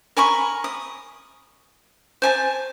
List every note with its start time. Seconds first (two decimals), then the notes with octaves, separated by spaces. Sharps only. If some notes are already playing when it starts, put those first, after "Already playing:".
0.17 A#4 G#5 B5 C#6
0.64 D#6
2.22 C5 G#5 A5